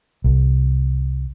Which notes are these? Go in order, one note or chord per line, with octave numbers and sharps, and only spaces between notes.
C2